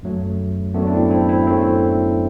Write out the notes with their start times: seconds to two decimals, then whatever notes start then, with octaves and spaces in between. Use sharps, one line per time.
0.03 F#2 F#3 A3
0.74 F#2 F#3 A3 B3 D4
0.87 D4
0.92 C4 E4
1.10 C4 E4
1.29 C4 E4
1.47 F#2 F#3 A3 C4